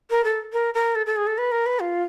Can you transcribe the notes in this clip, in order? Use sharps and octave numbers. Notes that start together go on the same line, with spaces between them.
A#4
A4
A#4
A#4
A4
A4
G#4
A4
B4
A#4
B4
F4